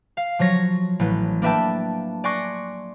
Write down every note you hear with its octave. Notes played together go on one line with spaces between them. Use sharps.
F5
F3 F#3 C#5 A#6
A1 B4
A#3 D4 B4 E5 G5 A5
D5 G#5 C6 C#6 F#6 A#6